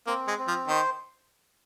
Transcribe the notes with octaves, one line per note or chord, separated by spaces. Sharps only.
A#3 C4
G#3
C4
F3
D#3 C5